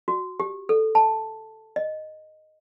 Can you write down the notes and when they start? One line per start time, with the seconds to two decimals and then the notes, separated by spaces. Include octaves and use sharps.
0.08 F#4
0.40 G4
0.69 A4
0.95 A5
1.76 D#5